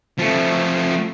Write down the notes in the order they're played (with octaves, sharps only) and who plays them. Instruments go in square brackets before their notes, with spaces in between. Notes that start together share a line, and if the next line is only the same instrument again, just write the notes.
[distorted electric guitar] F3 A3